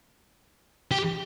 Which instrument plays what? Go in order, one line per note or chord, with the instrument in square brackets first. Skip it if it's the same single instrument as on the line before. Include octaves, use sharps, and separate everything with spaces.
[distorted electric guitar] G4